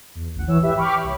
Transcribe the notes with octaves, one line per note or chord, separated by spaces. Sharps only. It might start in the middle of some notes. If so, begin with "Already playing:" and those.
E2
A1 D2 F#5
E3 C#5 E6
G#1 G4 B4 E5
G5 B5 C#6 D6 F6
C2 C#5